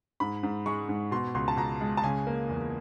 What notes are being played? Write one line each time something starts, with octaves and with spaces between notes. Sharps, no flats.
G#2 B5
G#2
G#3 C#6
G#2
B2 C6
C#2 C6
A5
C#2 A#5
G#3
A5
C#3 G#5
A#3
E2